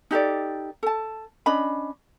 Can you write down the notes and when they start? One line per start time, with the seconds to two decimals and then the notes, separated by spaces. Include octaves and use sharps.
0.11 D#4 G4 A4 D5
0.83 A4 A5
1.46 C#4 D4 D#5 B5